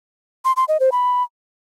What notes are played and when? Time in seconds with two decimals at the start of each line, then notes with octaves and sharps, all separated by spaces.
0.45 C6
0.57 C6
0.68 D#5
0.80 C5
0.92 B5